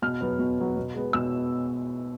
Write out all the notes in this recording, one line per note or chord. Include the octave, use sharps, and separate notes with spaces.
B2 F6
F#3 B3
B2
F#3 B3
B2
G#3 B3
B2 E6